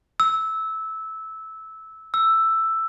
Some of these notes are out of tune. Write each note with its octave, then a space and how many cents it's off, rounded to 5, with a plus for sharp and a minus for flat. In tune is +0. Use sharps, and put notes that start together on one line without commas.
E6 -15
E6 +5